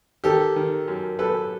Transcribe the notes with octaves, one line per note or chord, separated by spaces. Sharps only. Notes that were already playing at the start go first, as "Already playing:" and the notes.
D#3 G4 A4
D#3
F#2
F#2 A4 B4